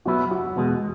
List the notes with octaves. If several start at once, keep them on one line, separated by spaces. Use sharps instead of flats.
B1 B2 F#3 B3 E4 F#4
F#4
E2 B2 G#3